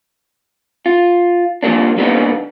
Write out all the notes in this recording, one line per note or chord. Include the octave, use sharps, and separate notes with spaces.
F4
F3 G3 A#3 D4
D#3 G3 A#3 B3 D4 D#4